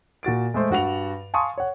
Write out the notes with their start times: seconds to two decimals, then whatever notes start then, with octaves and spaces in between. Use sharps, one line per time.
0.23 A#2 F#4 A6 D7
0.54 G#3 A3 C5
0.70 G2 F#4 F#5 F7
1.34 F5 G#5 A5 C6 C#6 D#6
1.58 C#5 F#5